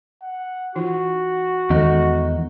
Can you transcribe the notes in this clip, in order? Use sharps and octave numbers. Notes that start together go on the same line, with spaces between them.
F#5
E3 D#4 F4 F#4
E2 D#3 G#3 D#4 A4